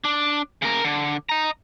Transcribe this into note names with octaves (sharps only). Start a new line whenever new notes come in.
D4
C#3 A#4
D3
D#5 A#5